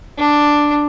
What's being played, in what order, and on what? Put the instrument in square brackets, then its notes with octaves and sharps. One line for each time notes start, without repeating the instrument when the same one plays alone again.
[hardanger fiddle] D4